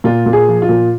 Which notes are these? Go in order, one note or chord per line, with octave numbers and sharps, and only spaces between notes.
A#2 F4
A#2
G#4
F3
F4
A#2